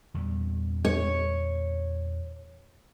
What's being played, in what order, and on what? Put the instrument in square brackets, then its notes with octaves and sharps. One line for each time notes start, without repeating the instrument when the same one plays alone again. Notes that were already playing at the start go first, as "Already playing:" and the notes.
[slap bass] E2 A#2 G3
[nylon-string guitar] C#5